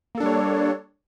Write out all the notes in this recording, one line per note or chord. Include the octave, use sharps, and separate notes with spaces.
G3 A#3 D4 A4 C#5